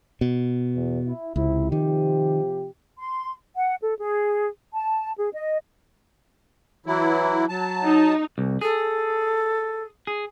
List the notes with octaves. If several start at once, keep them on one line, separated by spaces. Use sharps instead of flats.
B2
E2
E4
C#2 C3 E4
C3 D#3 F3 G4
C6
F#5
A4
G#4
A5
G#4
D#5
E3 F#3 E4
F#3 A5
D#4
C2
G#4 A4
G#4